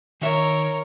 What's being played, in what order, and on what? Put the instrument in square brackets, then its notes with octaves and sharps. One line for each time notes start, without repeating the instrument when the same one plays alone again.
[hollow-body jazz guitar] D#3 E5 [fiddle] A#4 C#5